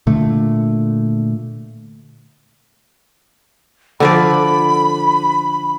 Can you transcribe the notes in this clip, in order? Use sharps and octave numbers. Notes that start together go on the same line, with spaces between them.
A#2 D3 A3
D3 F3 D5 B5